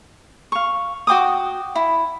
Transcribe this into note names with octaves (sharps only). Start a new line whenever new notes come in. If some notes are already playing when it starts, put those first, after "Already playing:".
F5 C#6
F#4 G5 D6 D#6
E4